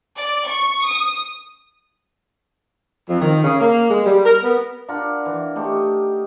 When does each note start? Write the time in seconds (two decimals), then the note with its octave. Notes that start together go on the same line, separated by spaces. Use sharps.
0.16 D5
0.46 C#6
0.86 D#6
3.09 F2
3.22 D#3
3.44 C#3
3.60 A#3
3.89 G#3
4.05 G3
4.25 A#4
4.44 B3
4.88 D4 F4 A#4 F#5
5.26 E3
5.56 A3 D#4 G4 C6